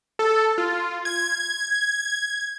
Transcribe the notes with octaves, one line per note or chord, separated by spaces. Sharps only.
A4
F4
G#6